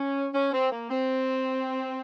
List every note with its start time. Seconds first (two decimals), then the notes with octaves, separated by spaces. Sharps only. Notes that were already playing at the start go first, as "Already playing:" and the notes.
Already playing: C#4
0.34 C#4
0.53 C4
0.71 A#3
0.90 C4